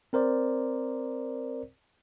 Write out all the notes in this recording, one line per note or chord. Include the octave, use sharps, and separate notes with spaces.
C4 A#4 C5 D5